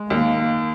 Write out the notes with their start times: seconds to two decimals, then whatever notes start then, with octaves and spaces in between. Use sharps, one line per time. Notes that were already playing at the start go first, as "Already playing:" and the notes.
Already playing: G#3
0.10 D#2 A#3